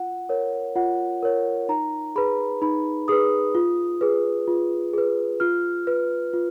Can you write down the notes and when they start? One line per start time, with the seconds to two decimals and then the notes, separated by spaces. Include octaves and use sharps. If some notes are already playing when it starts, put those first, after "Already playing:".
Already playing: F4 F#5
0.29 A#4 C#5
0.75 F4 F#5
1.23 A#4 C#5
1.69 D#4 A#5
2.16 G#4 B4 B5
2.62 D#4 B5
3.08 G#4 B4 D#6
3.55 F4
4.01 G#4 B4
4.48 F4
4.94 G#4 B4
5.40 F4 F6
5.87 B4
6.33 F4